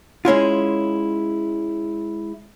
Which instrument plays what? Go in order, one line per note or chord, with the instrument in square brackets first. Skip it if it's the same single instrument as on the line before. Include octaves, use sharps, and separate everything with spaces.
[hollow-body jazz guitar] G#3 C#4 E4 F4